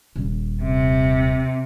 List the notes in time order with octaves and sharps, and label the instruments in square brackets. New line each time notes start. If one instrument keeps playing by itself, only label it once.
[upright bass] D#1
[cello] C3